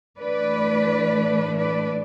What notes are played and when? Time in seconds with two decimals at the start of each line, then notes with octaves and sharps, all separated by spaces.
0.19 A2 E3 A3 D4 B4 D5
1.57 B4 D5